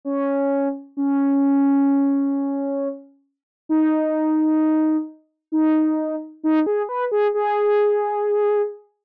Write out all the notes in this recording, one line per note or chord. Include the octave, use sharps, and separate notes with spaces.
C#4
C#4
D#4
D#4
D#4
G#4
B4
G#4
G#4